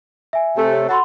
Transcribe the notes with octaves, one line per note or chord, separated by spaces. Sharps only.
E5 G#5
C3 A3
C#5
F#4 A4 F#5 B5 C6